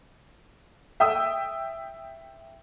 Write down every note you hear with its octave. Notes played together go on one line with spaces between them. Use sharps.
E5 G5 D#6 E6